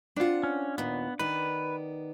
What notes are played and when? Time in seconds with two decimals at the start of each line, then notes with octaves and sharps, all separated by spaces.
0.16 C4 D4 F4 F#5
0.43 C#4
0.78 D#2 A#2 B3
1.19 D#3 B3 B4 D5